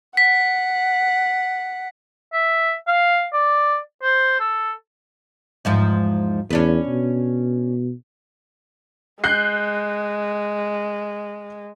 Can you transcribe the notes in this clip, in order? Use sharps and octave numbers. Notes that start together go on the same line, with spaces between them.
F#5 B6
E5
F5
D5
C5
A4
E2 G#2 F3
E2 C#4 D4 B4
B2
G#3 F#6 G6 C7